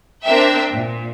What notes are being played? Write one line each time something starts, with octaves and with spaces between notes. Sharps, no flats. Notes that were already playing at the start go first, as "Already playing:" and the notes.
C4 D4 A#4 E5 G5
A#2